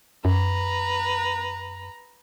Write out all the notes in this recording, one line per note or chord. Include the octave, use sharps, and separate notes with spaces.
F#2 B4 A#5